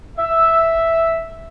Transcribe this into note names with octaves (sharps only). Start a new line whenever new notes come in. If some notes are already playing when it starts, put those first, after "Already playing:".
E5